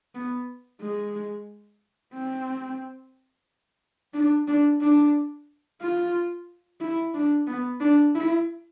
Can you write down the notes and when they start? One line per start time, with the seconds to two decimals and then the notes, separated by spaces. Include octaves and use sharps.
0.15 B3
0.81 G#3
2.14 C4
4.14 D4
4.48 D4
4.81 D4
5.81 F4
6.80 E4
7.14 D4
7.47 B3
7.80 D4
8.15 E4